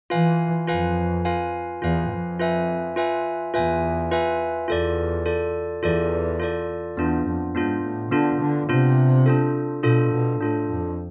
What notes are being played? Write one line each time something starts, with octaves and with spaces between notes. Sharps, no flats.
E3 F4 B4 F5 G#5
F2 F4 B4 F5 G#5
F4 B4 F5 G#5
E2 F4 B4 F5 G#5
F2
F4 B4 E5 G#5
F4 B4 E5 G#5
E2 F4 B4 E5 G#5
F4 B4 E5 G#5
E2 F4 A4 D5
F4 A4 D5
E2 F4 A4 D5
F4 A4 D5
E2 B3 D4 F4
F2
G#2 B3 D4 F4
A2
D3 B3 D4 F4
D3
C3 B3 D4 F4
D4 F4 A4
B2 D4 F4 A4
B2
A2 D4 F4 A4
F2